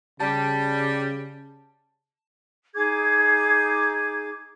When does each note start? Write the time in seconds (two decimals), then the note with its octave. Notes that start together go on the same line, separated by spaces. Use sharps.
0.20 C#3 G3 A5
2.74 D#4 G#4 D6 G#6